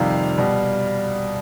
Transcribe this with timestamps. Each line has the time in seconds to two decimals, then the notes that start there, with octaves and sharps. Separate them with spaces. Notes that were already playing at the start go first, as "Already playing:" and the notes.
Already playing: F2 C3 D#3 G3 F5
0.38 B2 G3